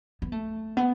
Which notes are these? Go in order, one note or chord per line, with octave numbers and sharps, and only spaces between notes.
B3
A3
B3